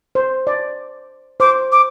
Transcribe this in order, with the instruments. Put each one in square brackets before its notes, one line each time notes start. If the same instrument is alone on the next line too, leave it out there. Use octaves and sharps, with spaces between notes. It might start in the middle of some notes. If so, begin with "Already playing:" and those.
[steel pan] C5
D5
[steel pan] C5 [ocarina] D6
[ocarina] D6